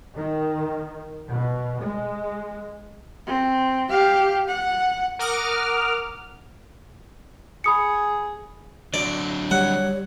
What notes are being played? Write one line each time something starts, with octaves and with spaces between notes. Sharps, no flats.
D#3
B2
G#3
C4
G4 F5
F#5
A#4 F#5 D6 D#6 F6
G#4 B5 D#6 C#7
D3 F#3 D4 D5
G3 C#5 F#5